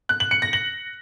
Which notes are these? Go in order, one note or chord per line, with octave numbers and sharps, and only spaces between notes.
F#6
F#7
C#7
A#6
F#7